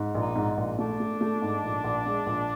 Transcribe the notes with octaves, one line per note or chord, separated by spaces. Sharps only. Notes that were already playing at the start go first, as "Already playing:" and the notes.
Already playing: G#2
A#1
D#4
G#2
A#1
A3 D4
A3
A3
G#2
A#1
A#1
G#3
A#1